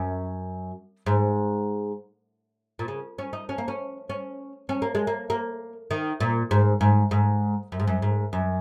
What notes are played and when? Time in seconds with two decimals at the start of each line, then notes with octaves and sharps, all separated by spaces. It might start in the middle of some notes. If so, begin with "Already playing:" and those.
Already playing: F#2
1.06 G#2
2.79 A#2
2.88 C#3
3.18 C#4
3.33 D#4
3.49 C#4
3.58 A#3
3.68 C#4
4.10 C#4
4.69 C#4
4.82 A#3
4.95 G#3
5.07 A#3
5.30 A#3
5.91 D#3
6.20 A#2
6.51 G#2
6.81 G#2
7.11 G#2
7.72 F#2
7.80 G#2
7.87 F#2
8.02 G#2
8.33 F#2